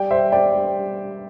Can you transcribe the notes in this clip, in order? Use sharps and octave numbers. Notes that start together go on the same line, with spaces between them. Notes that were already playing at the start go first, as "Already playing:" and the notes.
Already playing: G3 D5 G5
G3 C5 E5
G3 D5 G5
G3